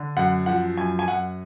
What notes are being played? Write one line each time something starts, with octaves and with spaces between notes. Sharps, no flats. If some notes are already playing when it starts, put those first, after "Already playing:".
Already playing: D3
F#2 F#5
F3 F#5
F#2 G#5
G#5
F#2 F#5